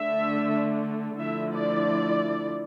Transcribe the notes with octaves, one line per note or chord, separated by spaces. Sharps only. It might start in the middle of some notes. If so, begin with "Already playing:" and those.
Already playing: D3 A3 D4 E5
D3 F3 A3 E4 E5
D5